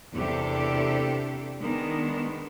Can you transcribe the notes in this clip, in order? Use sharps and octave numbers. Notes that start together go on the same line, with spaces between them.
E2 C3 D4 G4 A4
D#3 G#3 B3 D4